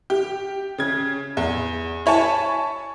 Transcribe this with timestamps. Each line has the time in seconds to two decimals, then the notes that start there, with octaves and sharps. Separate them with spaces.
0.10 G4
0.78 C#3 G#6
1.37 E2
2.06 E4 C#5 G#5 A5